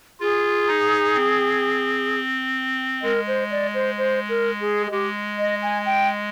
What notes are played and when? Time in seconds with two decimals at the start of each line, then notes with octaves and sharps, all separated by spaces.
0.20 F4 G#4
0.68 D#4
1.15 C4
3.03 G#3 A#4
3.27 C5
3.50 D5
3.74 C5
3.97 C5
4.28 A#4
4.60 G#4
4.86 G#4
4.91 G#3 G4
5.38 D#5
5.62 G#5
5.85 G5